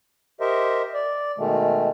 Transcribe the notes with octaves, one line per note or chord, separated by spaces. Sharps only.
G4 A#4 C5 D#5 E5
D5
B2 D#3 G#3 A3